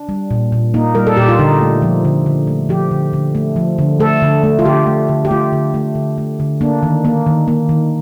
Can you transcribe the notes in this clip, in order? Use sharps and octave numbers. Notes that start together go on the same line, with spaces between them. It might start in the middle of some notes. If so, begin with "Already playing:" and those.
Already playing: D4
G3
A#2
A#2
A#3 D#4
G3 A#4
A4
A#2 G4
F4
D3 D#4
A3
F3
D3
D3
A3
F3 G4
D3
D3
A3
F3
D3
A3 A4
D3
A3
F4
D3 G4
A3
D3
G4
A3 F4
D3
A3
D3
A3
D3
A#3 D4
D#3
A#3
D#3
A#3
D#3